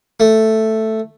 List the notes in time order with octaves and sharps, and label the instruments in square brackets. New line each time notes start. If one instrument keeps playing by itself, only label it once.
[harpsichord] A3